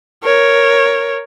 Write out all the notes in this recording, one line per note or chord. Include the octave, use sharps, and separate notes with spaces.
A#4 C#5